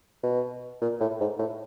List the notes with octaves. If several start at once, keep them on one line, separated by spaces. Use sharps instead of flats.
B2
A#2
A2
G#2
A2